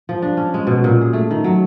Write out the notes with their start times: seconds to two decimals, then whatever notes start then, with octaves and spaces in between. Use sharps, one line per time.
0.09 F3
0.22 D4
0.37 C#4
0.54 G#3
0.67 B2
0.84 A#2
1.01 G#4
1.13 A3
1.31 D#3
1.44 F#3